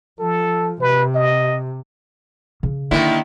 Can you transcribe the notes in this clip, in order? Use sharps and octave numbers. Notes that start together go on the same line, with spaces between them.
F3 A4
C3 B4
D#5
C#3
D3 D#3 A#3 E4